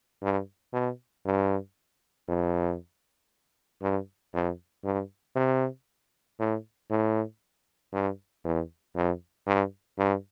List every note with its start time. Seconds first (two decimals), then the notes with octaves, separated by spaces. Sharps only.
0.22 G2
0.73 B2
1.25 G2
2.28 F2
3.82 G2
4.34 F2
4.84 G2
5.36 C3
6.39 A2
6.90 A2
7.93 G2
8.45 E2
8.96 F2
9.47 G2
9.98 G2